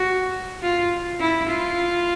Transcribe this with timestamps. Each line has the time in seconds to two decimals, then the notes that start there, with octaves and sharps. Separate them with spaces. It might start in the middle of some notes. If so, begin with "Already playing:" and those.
Already playing: F#4
0.62 F4
1.21 E4
1.50 F4